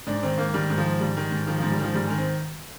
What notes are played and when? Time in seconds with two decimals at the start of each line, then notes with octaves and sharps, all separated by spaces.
0.07 G#2 D4
0.23 D#3 C4
0.38 G#2 A#3
0.54 D#3 G3
0.70 G#2
0.78 F3
0.85 D#3
1.00 G#2 G3
1.17 D#3
1.31 G#2
1.47 D#3 F3
1.58 G#2 F3
1.71 G3
1.79 D#3 F3
1.95 G#2 G3
2.06 D#3 G#3
2.18 C4